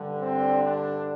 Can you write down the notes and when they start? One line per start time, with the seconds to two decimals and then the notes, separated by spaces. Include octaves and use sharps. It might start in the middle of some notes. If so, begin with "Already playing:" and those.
Already playing: G2 D3 G3
0.20 C4
0.63 D4